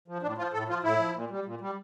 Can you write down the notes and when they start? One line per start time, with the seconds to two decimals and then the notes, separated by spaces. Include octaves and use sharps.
0.08 F3
0.22 A2 D4
0.38 F3 F4
0.53 A2 A4
0.68 F3 F4
0.83 A2 E4
0.99 F3
1.15 A#2
1.30 G3
1.45 A#2
1.61 G3